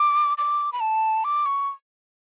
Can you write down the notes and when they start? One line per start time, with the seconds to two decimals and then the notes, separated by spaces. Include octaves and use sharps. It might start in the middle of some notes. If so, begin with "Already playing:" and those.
Already playing: D6
0.38 D6
0.72 B5
0.80 A5
1.24 D6
1.46 C#6